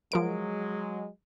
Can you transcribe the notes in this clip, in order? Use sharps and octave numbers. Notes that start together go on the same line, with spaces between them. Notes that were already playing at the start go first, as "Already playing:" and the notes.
F3 F#3 G#3 A#4 D7